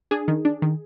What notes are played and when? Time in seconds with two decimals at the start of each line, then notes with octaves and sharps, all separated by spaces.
0.11 D4 G#4
0.28 D#3
0.45 D4
0.62 D#3